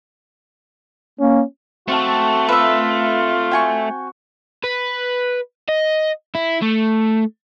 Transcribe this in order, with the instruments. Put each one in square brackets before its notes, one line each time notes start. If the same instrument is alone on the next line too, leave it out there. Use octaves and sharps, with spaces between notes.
[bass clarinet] A#3 [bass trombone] C#4
[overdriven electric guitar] A3 [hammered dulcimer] C4 F5 A5 [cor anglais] F#4
[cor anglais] F4 [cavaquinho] B4 E5
[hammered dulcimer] F#4 [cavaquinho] G5 G#5 C#6
[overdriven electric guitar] B4
D#5
E4
A3